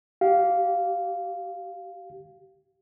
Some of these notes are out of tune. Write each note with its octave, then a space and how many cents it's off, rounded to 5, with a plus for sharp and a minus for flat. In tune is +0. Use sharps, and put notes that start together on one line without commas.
G4 -25 F5 +0